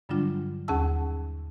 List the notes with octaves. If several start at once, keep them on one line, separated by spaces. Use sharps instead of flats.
G2 D3 F#3 G3 D4 F4
D#2 C#4 G#4 F#5 A5 E6